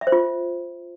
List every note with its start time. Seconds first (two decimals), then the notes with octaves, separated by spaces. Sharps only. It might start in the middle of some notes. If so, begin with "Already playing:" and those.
0.01 E5
0.07 C5
0.12 F4